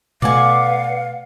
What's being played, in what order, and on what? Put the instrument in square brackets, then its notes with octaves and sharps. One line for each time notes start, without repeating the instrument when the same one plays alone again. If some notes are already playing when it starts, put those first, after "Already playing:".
[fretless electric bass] B2 A3 [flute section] B4 F#5 [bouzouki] D5 G#5 [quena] F5